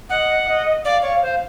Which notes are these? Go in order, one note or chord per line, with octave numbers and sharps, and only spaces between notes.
D#5 F#5
D#5
D5 F5
C#5
C5